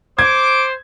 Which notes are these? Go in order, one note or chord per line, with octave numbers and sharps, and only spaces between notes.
C5 D6 G#6